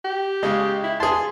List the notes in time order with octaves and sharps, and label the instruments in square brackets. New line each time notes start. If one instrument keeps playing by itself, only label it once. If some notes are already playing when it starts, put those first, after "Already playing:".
[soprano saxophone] G4
[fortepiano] C#3 G#3
[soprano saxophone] E4
[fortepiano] G#4 A5 [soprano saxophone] C6